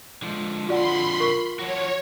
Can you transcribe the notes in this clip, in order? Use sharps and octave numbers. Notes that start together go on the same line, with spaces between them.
D3 F3 G#3
F4 F#4 D5 F#5 B5 C6
A#4 C#6
F3 F#4 C#5